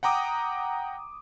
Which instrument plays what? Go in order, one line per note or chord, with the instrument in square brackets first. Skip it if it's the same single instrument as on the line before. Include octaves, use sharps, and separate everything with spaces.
[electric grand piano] F#5 G5 A#5 D6 D#6